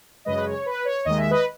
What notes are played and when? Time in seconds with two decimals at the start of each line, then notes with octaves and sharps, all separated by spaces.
0.25 F#2 C#3 G#3 B4 D#5
0.37 B4
0.46 C#5
0.66 B4
0.85 C#5
1.05 D#2 D#3 G#3 D#5
1.18 E5
1.30 B4 D#5